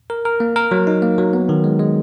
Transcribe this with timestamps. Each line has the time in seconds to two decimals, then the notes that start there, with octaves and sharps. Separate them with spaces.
0.10 A#4
0.25 A#4
0.40 A#3
0.56 A#4
0.71 F#3
0.87 D#4
1.02 A#3
1.18 F#3
1.33 B3
1.49 D#3
1.64 G#3
1.80 G#3